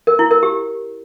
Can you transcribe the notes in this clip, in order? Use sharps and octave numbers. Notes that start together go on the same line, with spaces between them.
A#4
E4
A#4
G4